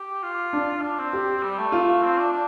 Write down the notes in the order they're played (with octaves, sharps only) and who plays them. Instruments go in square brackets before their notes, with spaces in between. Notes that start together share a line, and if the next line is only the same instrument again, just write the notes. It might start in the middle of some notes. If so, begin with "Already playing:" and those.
Already playing: [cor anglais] G4
F4
[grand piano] D4
[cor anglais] D4
C4
[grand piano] G4
[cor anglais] G3
A3
[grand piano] F4
[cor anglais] C4
D4
D4